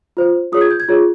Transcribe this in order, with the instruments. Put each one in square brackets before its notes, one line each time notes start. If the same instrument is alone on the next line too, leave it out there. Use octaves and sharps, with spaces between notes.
[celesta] F4 C5
F4 G#4 C#5 D#6
G#6
G6
G#6
F4 G#4 C#5